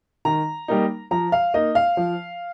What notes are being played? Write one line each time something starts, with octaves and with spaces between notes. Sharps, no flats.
D#3 A#5
G3 A#3 D#4
F3 A#5
F5
A#3 D#4 D#5
F5
F3